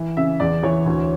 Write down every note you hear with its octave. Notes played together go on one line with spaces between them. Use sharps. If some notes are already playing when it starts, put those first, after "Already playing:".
Already playing: E3
C#3 E5
E2 D5
E3 C#5
D2